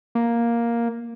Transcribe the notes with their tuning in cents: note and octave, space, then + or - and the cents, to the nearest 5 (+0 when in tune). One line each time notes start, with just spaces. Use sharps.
A#3 +5